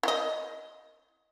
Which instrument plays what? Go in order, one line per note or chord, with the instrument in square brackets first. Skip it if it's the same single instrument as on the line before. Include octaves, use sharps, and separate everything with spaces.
[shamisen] E4 D#5